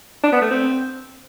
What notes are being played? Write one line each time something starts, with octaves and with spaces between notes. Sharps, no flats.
D4
B3
A3
C4